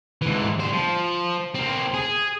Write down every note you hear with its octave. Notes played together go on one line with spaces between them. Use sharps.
G#2 E3
G3 C5
F3
C4 A#4
G#4